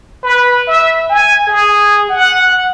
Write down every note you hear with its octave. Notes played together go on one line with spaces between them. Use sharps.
B4
E5
G#5
G#4
F#5